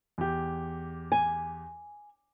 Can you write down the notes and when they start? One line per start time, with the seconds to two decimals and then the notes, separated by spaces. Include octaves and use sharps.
0.18 E2 G4
1.12 G#5